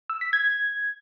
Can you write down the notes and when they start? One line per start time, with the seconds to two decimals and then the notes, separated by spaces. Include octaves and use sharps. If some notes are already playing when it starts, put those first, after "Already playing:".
0.10 E6
0.21 B6
0.33 G#6